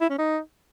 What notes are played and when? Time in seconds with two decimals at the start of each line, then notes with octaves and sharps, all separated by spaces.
0.01 E4
0.10 C#4
0.18 D#4